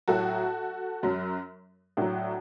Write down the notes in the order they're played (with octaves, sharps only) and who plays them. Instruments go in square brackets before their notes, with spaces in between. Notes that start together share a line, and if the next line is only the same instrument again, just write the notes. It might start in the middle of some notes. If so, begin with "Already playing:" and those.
[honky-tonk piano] A2 F#3 F#4 A4
F#2 F#3
A2 F#3 D4 F#4